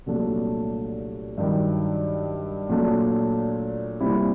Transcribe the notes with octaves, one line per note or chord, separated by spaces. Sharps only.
C2 A#2 F#3 A3 D4
G2 D#3 F#3
A#2 F#3 A3 D4
C2 A#2 G3 C4 E4